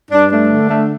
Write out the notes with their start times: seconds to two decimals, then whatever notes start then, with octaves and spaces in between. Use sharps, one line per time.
0.10 G2 D4
0.30 A3 D4
0.50 D3
0.68 A3